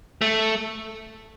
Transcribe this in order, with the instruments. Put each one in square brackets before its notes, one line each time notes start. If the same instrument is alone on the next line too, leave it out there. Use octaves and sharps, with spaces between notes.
[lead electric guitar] A3